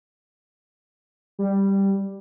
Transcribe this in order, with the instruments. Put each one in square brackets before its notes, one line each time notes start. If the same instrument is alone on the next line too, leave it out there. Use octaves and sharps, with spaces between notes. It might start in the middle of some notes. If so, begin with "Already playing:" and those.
[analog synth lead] G3